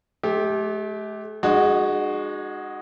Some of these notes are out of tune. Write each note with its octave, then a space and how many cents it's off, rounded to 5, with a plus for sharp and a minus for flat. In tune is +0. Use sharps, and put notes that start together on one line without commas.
A3 -45 G4 +0
G#3 +0 D#4 -40 F#4 +0